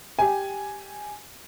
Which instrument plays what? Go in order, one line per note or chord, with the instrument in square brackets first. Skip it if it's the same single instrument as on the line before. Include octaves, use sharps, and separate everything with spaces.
[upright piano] G4 G#5